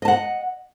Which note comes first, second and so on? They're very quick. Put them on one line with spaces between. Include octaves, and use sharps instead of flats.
D#5 A5 F#5